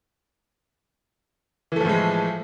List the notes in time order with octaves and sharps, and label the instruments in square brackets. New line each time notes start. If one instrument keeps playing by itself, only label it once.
[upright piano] E3
A3
F3
A2
G#3